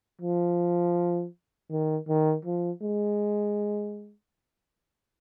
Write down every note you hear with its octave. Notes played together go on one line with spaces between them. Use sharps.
F3
D#3
D#3
F3
G#3